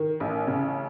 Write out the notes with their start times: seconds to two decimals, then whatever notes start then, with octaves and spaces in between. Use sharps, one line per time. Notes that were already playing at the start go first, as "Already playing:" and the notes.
Already playing: D#3
0.20 A1
0.47 C#3